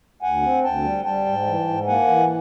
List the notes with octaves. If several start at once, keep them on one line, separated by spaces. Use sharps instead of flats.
D2 F#5 G#5
C4
D2 G5 A5
G3
G3 G5 A5
G#2
E3
G#2
A#3 F#5 G#5
E3